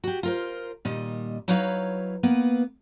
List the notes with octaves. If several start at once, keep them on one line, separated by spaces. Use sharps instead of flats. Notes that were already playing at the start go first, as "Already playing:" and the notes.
F#4 G4
F4 A#4 C5
A#2 D#3 G3 D#5
F#3 D#4 E4 B4 C#5 F5
A#3 B3 B4